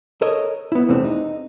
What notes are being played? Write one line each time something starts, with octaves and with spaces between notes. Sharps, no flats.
A4 A#4 C#5 D#5
B3 E4
E2 C3 A3 C4 D4
D#4